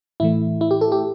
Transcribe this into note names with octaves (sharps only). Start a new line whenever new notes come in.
A2 E3 A3 E4
E4
G4
A4
G4